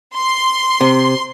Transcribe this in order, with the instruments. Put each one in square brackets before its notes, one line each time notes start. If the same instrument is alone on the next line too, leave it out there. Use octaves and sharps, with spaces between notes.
[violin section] C6
[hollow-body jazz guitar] C3